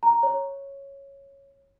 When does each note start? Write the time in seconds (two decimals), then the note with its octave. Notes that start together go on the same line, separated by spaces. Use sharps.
0.03 A#5
0.23 C#5